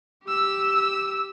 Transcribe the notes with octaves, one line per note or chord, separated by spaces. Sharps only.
G4 E6